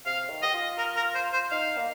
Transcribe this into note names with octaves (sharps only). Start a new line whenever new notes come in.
C3 F5
D#3
G4 D#5
F4
A#4
A#4
C5
C5
D#4 F5
A#3